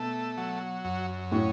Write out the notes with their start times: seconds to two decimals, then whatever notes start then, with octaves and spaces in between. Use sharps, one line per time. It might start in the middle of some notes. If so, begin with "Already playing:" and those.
Already playing: B2 A3
0.37 F#3
0.85 F#2
1.32 A2 C#4